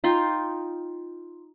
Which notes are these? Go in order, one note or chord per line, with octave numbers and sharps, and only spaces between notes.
D#4 F4 G5